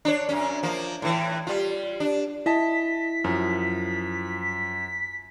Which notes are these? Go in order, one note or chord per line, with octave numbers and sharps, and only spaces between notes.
D4 C#5
F#2 C#4
F3 A#3
A2 E3
G3 F4
D4
E4 D#5 A5 B6
F#2 F3